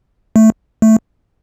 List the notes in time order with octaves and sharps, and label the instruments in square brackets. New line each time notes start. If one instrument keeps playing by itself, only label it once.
[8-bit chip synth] A3
A3